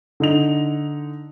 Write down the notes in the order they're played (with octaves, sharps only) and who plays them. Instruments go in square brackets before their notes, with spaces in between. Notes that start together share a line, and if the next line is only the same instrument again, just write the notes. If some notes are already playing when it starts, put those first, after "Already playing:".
[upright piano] D3 D#4 F7